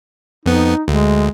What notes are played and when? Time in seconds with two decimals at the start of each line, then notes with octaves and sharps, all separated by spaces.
0.46 F2 B3 D#4
0.88 D2 G#3